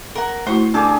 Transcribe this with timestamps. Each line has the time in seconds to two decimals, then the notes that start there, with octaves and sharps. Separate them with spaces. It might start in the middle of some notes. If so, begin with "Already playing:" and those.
0.15 A#4 F#5
0.47 A3 E4 F#4 C5 C#6
0.74 D3 G4 G#4 A5 D6